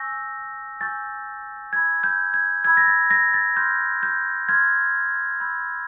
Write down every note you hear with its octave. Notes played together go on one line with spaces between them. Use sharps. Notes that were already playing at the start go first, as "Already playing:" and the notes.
Already playing: G#5 C#6 E6 G6 A#6
G#5 C#6 E6 G6 A6
B5 E6 G6 G#6
G6
G#6
B5 E6 G6 G#6
A#6
A6
A#6
A6
C6 F6 G6
G6
C6 F6 G#6
B5 E6 G6